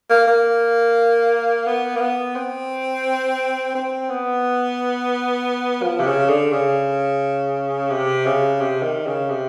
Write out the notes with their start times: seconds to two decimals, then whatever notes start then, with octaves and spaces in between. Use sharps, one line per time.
0.10 A#3
0.27 A#3
1.67 B3
1.96 A#3
2.01 B3
2.35 C4
3.75 C4
4.09 B3
5.83 F3
6.00 C3
6.06 C#3
6.29 D3
6.53 C#3
7.90 C3
8.26 C#3
8.60 C3
8.83 D#3
9.07 C#3
9.29 C3